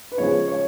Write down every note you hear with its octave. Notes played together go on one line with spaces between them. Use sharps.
B4
C#3 F3 G#3 C#5
C#5